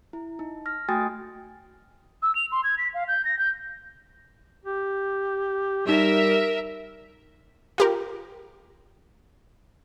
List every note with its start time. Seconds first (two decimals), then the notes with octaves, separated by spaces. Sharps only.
0.13 E4
0.39 D#4
0.66 F6 A#6
0.89 A3 F#4 G5 G#5 D#6 A6
2.22 E6
2.35 F7
2.52 C6
2.64 G#6
2.78 B6
2.94 F5
3.08 G6
3.25 A#6
3.39 G6
4.66 G4
5.87 G3 D#4 G4 A#4 E5
7.78 F4 G4 A#4